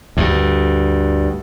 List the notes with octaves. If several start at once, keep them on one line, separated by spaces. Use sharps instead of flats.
D2 G2